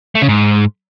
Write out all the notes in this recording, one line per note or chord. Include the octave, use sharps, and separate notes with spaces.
A3
C#3
G#2